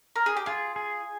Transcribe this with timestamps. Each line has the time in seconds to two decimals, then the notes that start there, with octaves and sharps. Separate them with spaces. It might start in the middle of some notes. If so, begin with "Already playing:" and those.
0.16 A#4
0.26 G#4
0.37 G4
0.46 F4 G#4
0.76 G#4